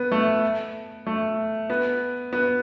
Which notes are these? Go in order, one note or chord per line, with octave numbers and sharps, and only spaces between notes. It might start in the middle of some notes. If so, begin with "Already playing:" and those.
Already playing: B3
A3
A3
B3
B3